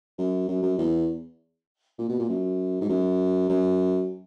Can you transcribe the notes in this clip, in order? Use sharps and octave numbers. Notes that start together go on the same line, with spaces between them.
F#2
F#2
F#2
E2
A#2
B2
A#2
F#2
G#2
F#2
F#2